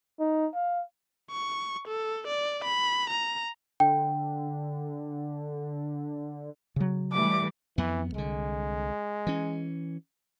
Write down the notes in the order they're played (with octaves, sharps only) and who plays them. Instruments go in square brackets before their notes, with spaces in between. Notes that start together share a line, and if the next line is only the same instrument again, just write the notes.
[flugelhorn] D#4
F5
[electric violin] C#6
A4
D5
B5
A#5
[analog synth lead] D3 [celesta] G5
[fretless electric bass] C#3 F#3
[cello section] E3 G3 A3 [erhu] D6
[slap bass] F2 B3 [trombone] E3
[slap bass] C2 D3 [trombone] G#3
[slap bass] E3 C#4